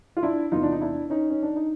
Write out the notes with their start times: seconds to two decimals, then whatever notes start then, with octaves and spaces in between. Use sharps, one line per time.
0.17 F4
0.23 D4 E4
0.52 E2 C3 E3 D#4 F4
0.63 D4
0.72 D#4
0.81 D4 E4
1.10 C#4 D#4
1.30 C#4
1.43 D4
1.56 D#4